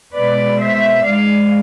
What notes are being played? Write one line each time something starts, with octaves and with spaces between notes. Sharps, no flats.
B2 G#3 B4 D5
C5 E5
G#2 G#3 D5 F5